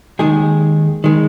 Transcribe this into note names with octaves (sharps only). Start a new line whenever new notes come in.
D#2 D#3 G#3 G#4
D#3 G#3